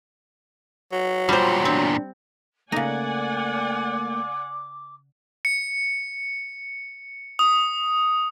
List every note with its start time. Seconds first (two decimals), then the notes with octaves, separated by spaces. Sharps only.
0.92 F#3
1.29 E2 A#2 G3 F4 C5
1.65 C4 D4
2.72 C#3 A3 A#3 D#4 D5 F#5 G#5 D6
5.45 C#7
7.39 D#6